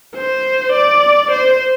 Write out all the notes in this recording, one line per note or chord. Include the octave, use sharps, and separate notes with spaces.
C5
D5
C5